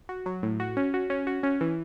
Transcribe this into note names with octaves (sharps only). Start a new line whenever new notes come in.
F#4
F#3
A2
F#4
C#4
F#4
C#4
F#4
C#4
E3